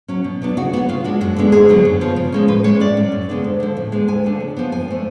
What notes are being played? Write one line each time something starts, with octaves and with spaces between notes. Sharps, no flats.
F#3 C#4
B2
F#3 B3 D4
C#3 F#4
F#3 B3 F#4
C#3 F4
G#3 D4 F#4
F#2 F#4
D3 G#3 B3 D4
D2 G#4
D3 F#3 B3
F#2
F3 B3
C#3
F3 G#3 C#4
A2 B4
G#3 C#4 C#5
A2 D5
F#3 C#4
F#2
C#3 G#3 B3 D4
D2
D3 F3
A2
G#3 B3 D4
D2 G#5
D3 F3 A3 D4
C#3
F3 B3
F#2 G#5
F3 A3 D4